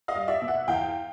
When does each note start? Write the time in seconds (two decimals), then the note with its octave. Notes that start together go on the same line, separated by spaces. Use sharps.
0.08 D#5 F5
0.15 G3
0.28 D5 E5
0.41 B2
0.48 E5 F#5
0.68 E2 F5 G5